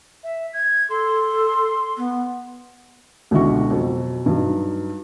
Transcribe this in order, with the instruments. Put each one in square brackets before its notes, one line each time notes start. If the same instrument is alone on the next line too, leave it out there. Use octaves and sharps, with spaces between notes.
[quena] E5
G#6
[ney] A4 [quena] C6
[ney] B3
[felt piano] C#2 B2 D3 E4 F#4 C#6
F2 B2 F#3
G2 F#3 D#4